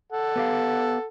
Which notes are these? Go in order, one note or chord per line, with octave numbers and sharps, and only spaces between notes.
A4 F#5
B3 G4 F5